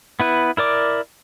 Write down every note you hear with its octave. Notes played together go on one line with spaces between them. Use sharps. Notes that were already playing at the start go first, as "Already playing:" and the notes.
B3 E4 B4
E4 A#4 D5 D6